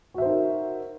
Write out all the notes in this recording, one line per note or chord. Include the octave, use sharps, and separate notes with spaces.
D#4 F#4 A#4 C5 E5